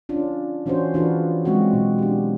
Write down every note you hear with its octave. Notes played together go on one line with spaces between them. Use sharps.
C#4 D4 F4
E3 C#4 D4 F#4 C5
E3 D4 F4 F#4 G#4 B4
F#3 G#3 C4 D4 F#4
B2
D4 G4